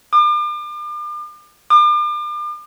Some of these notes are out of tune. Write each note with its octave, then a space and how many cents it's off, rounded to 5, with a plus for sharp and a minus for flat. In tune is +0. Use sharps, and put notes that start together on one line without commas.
D6 +40
D6 +40